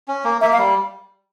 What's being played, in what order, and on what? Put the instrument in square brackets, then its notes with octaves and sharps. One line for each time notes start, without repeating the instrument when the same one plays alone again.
[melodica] C#4
A#3
[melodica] A#3 [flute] E5
[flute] F5
[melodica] G3